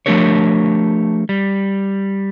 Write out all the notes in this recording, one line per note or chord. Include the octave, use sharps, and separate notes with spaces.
F3 A3 D4 G4 A#4 C#5
G3